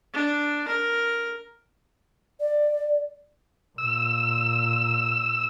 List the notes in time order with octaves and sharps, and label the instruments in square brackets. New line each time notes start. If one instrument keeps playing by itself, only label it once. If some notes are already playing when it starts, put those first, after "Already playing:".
[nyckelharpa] D4
A#4
[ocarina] D5
[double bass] A#2 [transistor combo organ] E6